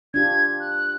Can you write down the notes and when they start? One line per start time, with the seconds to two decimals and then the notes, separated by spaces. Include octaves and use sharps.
0.14 D4 F4 G4 G#6
0.60 F#6